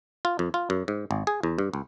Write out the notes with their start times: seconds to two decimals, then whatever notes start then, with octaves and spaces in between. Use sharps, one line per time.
0.25 F4
0.39 F2
0.54 F4
0.70 F#2
0.88 G#2
1.11 G#1
1.27 G#4
1.43 E2
1.59 G2
1.74 C#2